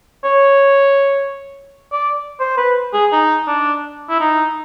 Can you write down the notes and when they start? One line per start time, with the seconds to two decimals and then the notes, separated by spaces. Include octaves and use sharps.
0.25 C#5
1.93 D5
2.40 C5
2.58 B4
2.94 G#4
3.13 D#4
3.48 D4
4.10 E4
4.20 D#4